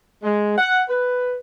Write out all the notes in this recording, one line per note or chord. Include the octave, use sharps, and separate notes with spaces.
G#3
F#5
B4